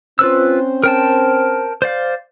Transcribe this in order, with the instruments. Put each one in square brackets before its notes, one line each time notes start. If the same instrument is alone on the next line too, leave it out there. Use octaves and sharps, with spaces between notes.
[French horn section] C4 C#4 C5 [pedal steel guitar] F4 B4 E6
[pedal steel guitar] A#4 G5 A5
C5 D5 F5